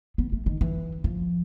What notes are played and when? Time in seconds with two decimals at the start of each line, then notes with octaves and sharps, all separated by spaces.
0.18 B3
0.32 A3
0.46 D#3
0.61 E3
1.04 F3